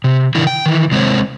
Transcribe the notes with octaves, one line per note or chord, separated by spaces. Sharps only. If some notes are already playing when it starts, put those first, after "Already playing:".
C3
D#3 D4 E4
G5
D#3 E3
C3 G#3 C4 G#4 C5 C#5